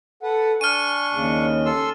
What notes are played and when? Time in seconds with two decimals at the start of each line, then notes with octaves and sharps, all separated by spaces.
0.23 A4 B4 F#5
0.61 D4 G#5 C#6 F6 D#7
1.12 D#2 C#3
1.66 A4 C6 E6